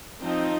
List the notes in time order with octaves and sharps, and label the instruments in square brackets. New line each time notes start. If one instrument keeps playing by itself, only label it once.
[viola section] F3 C4 D#4